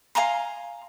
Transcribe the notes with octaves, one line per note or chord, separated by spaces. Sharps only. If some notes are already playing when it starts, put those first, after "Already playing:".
F5 G#5 A#5 C6